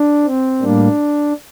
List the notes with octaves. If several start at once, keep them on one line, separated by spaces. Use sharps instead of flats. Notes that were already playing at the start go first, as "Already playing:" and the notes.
Already playing: D4
C4
A2 G3 A#3 D4